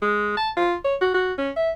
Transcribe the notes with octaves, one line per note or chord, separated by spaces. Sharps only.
G#3
A5
F4
C#5
F#4
F#4
C#4
E5